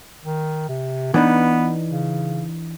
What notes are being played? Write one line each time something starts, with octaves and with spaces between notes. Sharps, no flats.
D#3
C3
E3 B3 D4 D#4
C#3